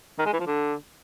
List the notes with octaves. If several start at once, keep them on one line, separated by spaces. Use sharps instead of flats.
D#3
G#3
E3
F3
D3